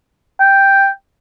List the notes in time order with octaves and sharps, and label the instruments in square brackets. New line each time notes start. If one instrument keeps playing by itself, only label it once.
[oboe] G5